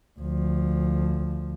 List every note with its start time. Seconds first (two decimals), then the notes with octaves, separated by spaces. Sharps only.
0.20 D2 F3